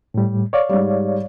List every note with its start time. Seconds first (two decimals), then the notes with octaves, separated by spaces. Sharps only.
0.14 A2 G3
0.53 C#5 D5 F5
0.69 G#2 G3